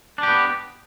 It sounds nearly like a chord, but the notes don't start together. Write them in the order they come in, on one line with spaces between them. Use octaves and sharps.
D4 G4 B3